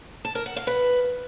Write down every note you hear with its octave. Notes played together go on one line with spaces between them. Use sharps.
A5
A#4
F#5
F5
B4